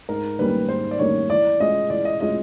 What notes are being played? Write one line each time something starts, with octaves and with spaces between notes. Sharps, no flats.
G#2 A#4
D#3 G3 A#3 C#4 B4
G#2 C5
D5
D#3 G3 A#3 C#4 C#5
E3 D5
G#3 C#4 F4 G#4 D#5
E3 D5
D#5
G#3 C#4 F4 G#4 D#5